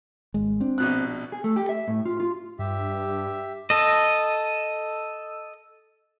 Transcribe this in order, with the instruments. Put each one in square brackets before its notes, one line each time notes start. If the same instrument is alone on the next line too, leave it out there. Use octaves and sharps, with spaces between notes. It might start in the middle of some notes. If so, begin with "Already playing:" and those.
[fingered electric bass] G#1 G#3
C4 D4
[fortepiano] A#1 B2 F#6
[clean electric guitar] G#4
A3
G4
E5
A2
F4
F4
[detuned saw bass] G2 [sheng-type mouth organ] G4 E5
[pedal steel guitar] A4 D#5